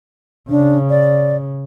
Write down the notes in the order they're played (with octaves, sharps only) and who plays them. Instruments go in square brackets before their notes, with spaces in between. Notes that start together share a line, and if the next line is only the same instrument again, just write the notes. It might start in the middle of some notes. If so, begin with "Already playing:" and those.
[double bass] C#3 [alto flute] D4
[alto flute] D5